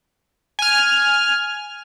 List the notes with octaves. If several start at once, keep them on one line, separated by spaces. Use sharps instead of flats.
G#5 F6